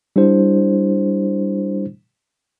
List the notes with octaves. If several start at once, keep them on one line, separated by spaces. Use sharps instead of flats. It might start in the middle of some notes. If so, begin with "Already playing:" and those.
G3 D4 E4 G4 C5